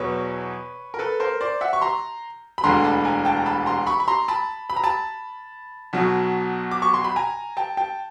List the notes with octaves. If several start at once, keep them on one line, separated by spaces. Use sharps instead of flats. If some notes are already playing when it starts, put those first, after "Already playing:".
Already playing: E2 B2 F#3 B4 C#5
A#4
A4 B4
A#4 C5
C5 D5
E5 F#5
C#6
A#5 C6
B5
E1 D2 D3 A#5 C6
A5 B5
G#5 A#5
G5 A5
A#5
A5 B5
A#5 C6
B5 C#6
B5
A#5 C6
A5 B5
B5
A#5
A5 B5
B1 B2 F#3
D6
C#6
C6
B5
G#5 A#5
G5 A5
G5 A5